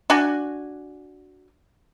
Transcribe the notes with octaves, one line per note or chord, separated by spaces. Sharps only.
D4 F#4 G#5